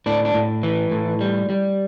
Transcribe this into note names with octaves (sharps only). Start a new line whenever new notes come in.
A2 D4
D4
A2
E3
A2
G3
G3